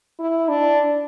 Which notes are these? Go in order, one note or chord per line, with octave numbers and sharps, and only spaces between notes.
E4
D4